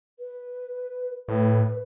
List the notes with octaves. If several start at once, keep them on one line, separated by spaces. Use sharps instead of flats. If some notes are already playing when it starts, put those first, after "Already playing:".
B4
A2 B4